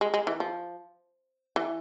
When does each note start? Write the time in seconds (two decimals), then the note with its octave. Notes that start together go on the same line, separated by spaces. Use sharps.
0.01 G#3
0.14 G#3
0.27 E3
0.40 F3
1.56 E3